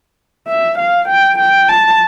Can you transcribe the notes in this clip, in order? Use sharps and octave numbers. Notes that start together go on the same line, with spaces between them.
E5
F5
G5
G5
A5